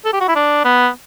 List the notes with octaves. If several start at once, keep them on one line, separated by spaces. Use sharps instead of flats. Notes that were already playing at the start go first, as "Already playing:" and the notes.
A4
G4
F#4
E4
D4
B3